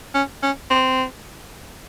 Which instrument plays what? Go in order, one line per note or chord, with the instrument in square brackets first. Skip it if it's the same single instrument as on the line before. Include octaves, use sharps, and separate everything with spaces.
[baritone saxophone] C#4
C#4
C4